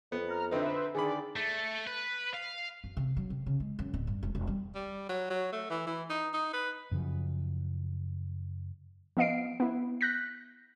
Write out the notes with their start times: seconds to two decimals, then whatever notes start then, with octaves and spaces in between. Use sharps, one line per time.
0.12 F2 B3
0.28 A#5 F6
0.51 D3 C4 D#4 B4 C5 E5
0.95 D3 D#3 G#4 D5 B5
1.36 A3
1.87 B4
2.34 F5
2.84 F#2
2.97 C3
3.17 F#3
3.30 C3
3.46 C#3
3.60 G#3
3.79 F#2
3.94 D1
4.07 G2
4.23 E1
4.35 E1
4.47 G3
4.75 G3
5.09 F#3
5.30 F#3
5.52 A3
5.70 E3
5.87 E3
6.10 D#4
6.33 D#4
6.53 B4
6.91 F#2 C#3 F3
9.17 F3 B3 D#5 F5 C7 D7
9.60 B3 E4
10.01 F#6 G6 A#6 B6